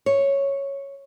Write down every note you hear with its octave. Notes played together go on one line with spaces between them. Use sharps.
C#5